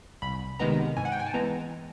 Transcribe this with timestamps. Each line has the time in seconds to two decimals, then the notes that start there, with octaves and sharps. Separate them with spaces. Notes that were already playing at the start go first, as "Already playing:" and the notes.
0.22 C2 B5
0.59 C3 D#3 G#3 B3 A#5
0.97 G#2 G#5
1.05 F#5
1.12 G5
1.19 G#5
1.26 A5
1.34 E3 G#3 B3 A#5